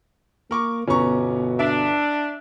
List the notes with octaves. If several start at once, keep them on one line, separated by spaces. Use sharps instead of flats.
A#3 A#4 C#6 D6
G1 B2 B3 C#4 A#5 C#6
D4 E5